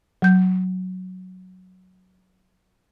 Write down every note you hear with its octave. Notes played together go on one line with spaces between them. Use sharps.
F#3 G6